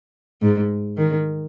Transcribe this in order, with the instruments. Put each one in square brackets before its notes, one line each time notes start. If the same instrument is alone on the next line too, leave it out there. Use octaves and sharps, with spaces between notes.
[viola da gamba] G#2
D#3